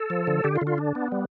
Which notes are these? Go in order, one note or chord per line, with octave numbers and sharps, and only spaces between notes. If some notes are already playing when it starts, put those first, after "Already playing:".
Already playing: A4
F3
D3
D3 G4
F4
D3
F4
D4
B3
G3